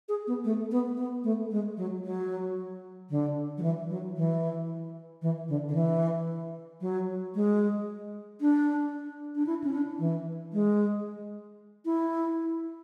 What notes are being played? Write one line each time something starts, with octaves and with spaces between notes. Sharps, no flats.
G#4
B3
A3
B3
B3
A3
G#3
F#3
F#3
D3
F#3
E3
F#3
E3
E3
D3
D3
E3
F#3
G#3
D4
D4
E4
C#4
D4
E3
G#3
E4